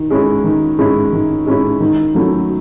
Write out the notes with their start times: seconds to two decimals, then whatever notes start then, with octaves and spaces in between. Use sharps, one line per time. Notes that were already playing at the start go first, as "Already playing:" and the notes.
Already playing: D#3
0.10 G#3 C#4 E4
0.44 D#3
0.79 G#3 C#4 E4
1.13 D#3
1.46 G#3 C#4 E4
1.80 D#3
2.14 F#3 A3 C#4 E4